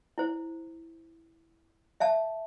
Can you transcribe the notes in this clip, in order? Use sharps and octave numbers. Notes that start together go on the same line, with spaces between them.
E4 C5
E5 F5 A5